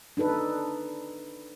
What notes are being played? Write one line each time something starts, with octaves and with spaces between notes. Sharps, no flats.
D4 D#4 A4 B4